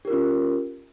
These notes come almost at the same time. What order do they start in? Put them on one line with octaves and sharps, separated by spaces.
G4 A#4 F4 C#4